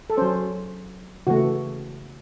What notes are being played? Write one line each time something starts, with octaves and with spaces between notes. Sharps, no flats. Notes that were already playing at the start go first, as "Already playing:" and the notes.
A4
F#3 C#4 C5
C#3 E3 A3 F#4